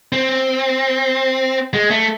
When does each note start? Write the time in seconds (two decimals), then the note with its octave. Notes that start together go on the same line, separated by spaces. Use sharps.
0.12 C4
1.73 G#3
1.91 A3